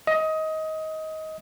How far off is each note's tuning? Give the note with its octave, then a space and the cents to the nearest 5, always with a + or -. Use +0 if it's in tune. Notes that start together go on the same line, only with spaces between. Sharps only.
D#5 +20